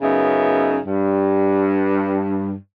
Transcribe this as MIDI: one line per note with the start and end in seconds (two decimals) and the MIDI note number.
0.02 0.78 42
0.02 0.78 49
0.02 0.78 59
0.02 0.78 63
0.02 0.78 76
0.86 2.54 43